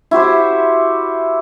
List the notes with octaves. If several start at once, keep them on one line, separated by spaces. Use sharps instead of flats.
E4 F#4 G4 C5